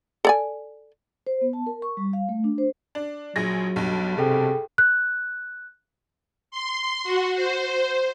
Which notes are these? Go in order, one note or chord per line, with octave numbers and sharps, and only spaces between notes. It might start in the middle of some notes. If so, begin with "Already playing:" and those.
A4 D5 G#5
C5
B3
A5
A#4
C#6
G3
F5
A3
D4
C5
D4
A#1 F#3 G#4 A#6
B1 G2
C3 G#4 A4 G5
F#6
C6
F#4
C5